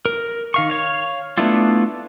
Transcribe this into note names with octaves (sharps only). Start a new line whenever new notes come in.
A#4
D#3 F5 C#6
C#5 F5
A3 B3 D4 E4 F4